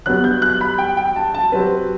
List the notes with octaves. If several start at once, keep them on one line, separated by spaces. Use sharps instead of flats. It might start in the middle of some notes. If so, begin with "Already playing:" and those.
G2 F#3 B3 F#6
G6
F#6
B5
G5
G5
A5
A5
C3 F#3 C4 B4